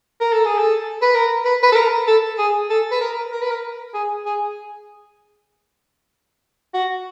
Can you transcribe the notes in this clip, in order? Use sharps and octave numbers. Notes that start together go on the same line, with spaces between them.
A#4
A4
G#4
A4
B4
A#4
B4
B4
A4
A#4
A4
G#4
A4
B4
A#4
A#4
B4
A#4
G#4
G#4
F#4